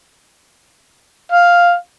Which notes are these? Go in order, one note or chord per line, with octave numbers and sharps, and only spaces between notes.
F5